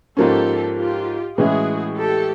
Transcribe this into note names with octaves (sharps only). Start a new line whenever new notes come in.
G#2 F3 A#3 C#4 G4 A4
F4 G4
A2 E3 G#3 C#4 E4 F#4 G#4
G4 A4